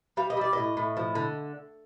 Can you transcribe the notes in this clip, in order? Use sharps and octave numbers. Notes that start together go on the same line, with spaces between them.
G3 F5
D#5
G3 D5
A2 D#5
A2
F3
D3